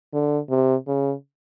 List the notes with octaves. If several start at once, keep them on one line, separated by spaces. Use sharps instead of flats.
D3
C3
C#3